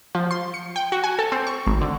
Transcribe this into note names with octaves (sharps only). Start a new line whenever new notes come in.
F3
C6
C#7
G5
F#4
G#5
A4
C4
C#6
G#1
D3